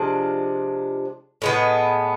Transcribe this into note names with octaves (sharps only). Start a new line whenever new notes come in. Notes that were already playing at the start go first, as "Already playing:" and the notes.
Already playing: C3 F3 G#3 D4
A2 G#3 B3